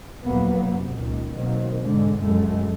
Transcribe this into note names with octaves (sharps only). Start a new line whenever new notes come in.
F1 D#2 A#2 F#3 A#3 B3
F#2 C3
C#2 A#2 D#3
B2 D#3 F#3 A#3 C4
G#2 D3 G#3
F1 F#2 A2 G#3 A3